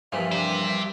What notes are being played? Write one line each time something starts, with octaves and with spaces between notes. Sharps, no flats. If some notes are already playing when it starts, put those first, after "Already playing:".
G2 A#2 E3 F3 E5
G4 C5